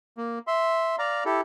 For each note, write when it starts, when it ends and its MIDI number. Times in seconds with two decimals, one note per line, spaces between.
0.18 0.39 58
0.47 0.96 76
0.47 0.96 84
0.99 1.24 74
0.99 1.24 77
0.99 1.24 82
1.25 1.41 64
1.25 1.41 67
1.25 1.41 69